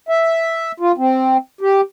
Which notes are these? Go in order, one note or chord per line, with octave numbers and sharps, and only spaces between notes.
E5
F4
C4
G4